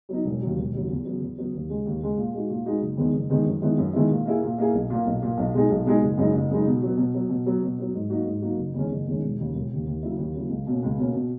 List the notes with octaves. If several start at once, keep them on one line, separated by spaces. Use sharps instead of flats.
F#3 B3 D#4
E1
D#2 C#3 F#3
E1
D#2 C#3 F#3
E2
C#3 F#3 B3
E2
C#3 F#3 B3
D#2
C#3 G#3
D#2
C#3 G#3
A#2
G#3 D#4 F#4
A#2
G#3 D#4 F#4
F#1
E2 D#3 G#3 B3
F#1
E2 D#3 G#3 B3
F#2
D#3 G#3 B3 E4
F#2
D#3 G#3 B3 E4
A#2
A#3 E4 G#4
A#2
A#3 E4 G#4
B1
A#2 A#3
B1
A#2 A#3
B1
B2 G#3 D#4 G#4
B1
B2 G#3 D#4 G#4
F#1
F#2 C#3 G#3 D#4
F#1
F#2 C#3 G#3 D#4
B2
F#3 B3
B2
F#3 B3
B2
F#3 B3
B2
F#3 B3
G#2
F#3 A#3 D#4 F#4
G#2
F#3 A#3 D#4 F#4
F#1
E2 D#3 G#3 C#4
F#1
E2 D#3 G#3 C#4
E1
D#2 C#3
E1
D#2 C#3
D#2
C#3 F#3 A#3 E4
D#2
C#3 F#3 A#3 E4
C#2
B2 A#3 C#4
C#2
B2 A#3 C#4
B2